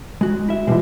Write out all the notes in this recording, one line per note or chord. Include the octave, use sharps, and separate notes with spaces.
G#3 F#4
E4 E5
F2 B2 F3 G3 G#3 E4